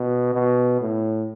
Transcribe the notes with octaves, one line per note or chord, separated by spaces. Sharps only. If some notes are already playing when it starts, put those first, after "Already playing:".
Already playing: B2
B2
A2